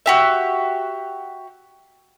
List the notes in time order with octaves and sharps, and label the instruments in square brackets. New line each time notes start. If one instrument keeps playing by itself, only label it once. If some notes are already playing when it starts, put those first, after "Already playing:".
[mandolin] F#4 G4 E5